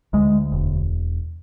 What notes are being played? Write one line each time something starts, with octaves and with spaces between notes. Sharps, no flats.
D2 G#3
E1